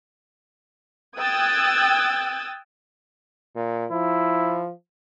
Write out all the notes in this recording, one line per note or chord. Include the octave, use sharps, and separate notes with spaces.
G5 D#6 E6 F#6 G#6 A6
A#2
F3 E4